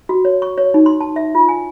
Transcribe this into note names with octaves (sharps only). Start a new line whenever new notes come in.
F#4
C#5
C#6
C#5
D#4
C6
A5
E5
F4
G#5